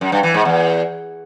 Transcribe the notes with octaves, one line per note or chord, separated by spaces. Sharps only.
F#2
G2
E3
G#2
E2